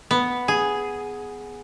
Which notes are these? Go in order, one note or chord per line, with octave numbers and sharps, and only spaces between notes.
B3
G#4